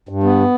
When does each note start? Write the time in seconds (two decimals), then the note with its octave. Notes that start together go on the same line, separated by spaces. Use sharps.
0.09 G2
0.23 B3